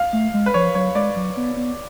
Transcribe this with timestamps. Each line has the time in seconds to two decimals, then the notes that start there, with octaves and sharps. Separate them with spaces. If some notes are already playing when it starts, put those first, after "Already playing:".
Already playing: F5
0.13 A3
0.34 G#3
0.46 B4
0.54 F3 C#5
0.75 F#3 C#5
0.95 G#3 D5
1.16 F#3
1.37 B3
1.57 B3